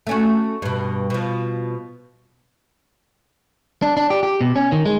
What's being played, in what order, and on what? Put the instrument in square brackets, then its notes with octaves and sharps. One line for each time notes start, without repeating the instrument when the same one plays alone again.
[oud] A3 C#4 F#4
G2 B2
B2 F3
[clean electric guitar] D4
D4
G4
G4
B2
C#4
D#3
G#3